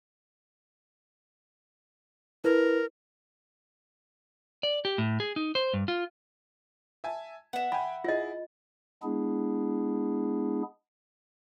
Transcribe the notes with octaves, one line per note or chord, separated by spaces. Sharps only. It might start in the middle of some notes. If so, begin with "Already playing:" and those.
E4 A#4 B4
D5
G4
A2
G#4
D#4
C5
G2
F4
E5 G#5 A5
B3 E5 F#5
G5 G#5 B5
E4 F4 G#4 D#5
G#3 B3 D4 E4 G#4